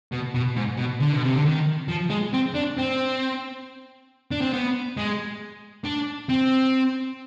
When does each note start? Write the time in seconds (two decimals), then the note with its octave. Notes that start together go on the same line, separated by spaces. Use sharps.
0.12 B2
0.34 B2
0.56 G#2
0.78 B2
1.01 D3
1.13 B2
1.24 C3
1.35 D3
1.45 D#3
1.88 F3
2.10 G#3
2.33 C4
2.54 D4
2.77 C4
4.31 D4
4.42 C4
4.53 B3
4.97 G#3
5.85 D4
6.29 C4